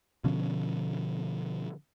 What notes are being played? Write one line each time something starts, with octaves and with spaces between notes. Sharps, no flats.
B2 D3 F3 C#4